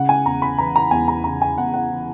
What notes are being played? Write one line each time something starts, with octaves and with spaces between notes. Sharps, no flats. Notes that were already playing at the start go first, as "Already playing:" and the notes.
Already playing: C#3 F#5
G#5
E2 A#5
B5
E3 A#5
A#5
E2 G#5
A#5
C#3 A#5
G#5
E2 F#5
F#5
E3